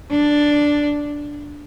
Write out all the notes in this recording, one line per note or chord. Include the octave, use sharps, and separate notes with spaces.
D4